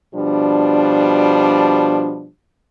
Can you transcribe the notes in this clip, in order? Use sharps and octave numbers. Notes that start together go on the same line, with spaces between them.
B2 F3 G3 D4